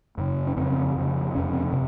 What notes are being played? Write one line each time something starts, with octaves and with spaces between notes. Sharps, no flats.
F#2 C#3
C#4
F2 C#3 C4
F2 C#3
F2 C3 C#4
C4
C3